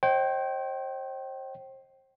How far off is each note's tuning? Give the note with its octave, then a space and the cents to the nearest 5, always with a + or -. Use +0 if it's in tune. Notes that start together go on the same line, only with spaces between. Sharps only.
C5 +35 D#5 -5 G5 -25